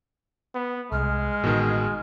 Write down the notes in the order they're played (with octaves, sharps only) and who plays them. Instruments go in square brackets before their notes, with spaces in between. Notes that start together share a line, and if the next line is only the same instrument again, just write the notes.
[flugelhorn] B3
[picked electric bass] C2 [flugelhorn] G#3 [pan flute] F6
[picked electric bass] A1 [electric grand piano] B2 D#3